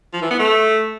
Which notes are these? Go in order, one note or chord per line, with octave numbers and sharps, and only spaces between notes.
F3
E3
B3
A3